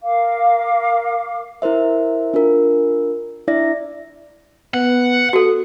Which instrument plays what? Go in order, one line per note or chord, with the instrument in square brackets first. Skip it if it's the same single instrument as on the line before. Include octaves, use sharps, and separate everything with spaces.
[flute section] A#4 F5 D6
[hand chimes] E4 A#4 C5 E5
D4 F4 A#4
D4 E4 D5 E5 A#6
[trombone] B3 [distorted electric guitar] F#5
[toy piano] F#4 A4